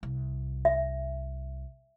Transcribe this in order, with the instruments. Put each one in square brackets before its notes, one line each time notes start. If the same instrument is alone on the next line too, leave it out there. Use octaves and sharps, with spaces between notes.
[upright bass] C2
[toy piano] E5